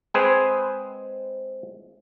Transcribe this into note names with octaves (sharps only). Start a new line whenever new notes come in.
G#3 C4 G#4 B4 C5 G#5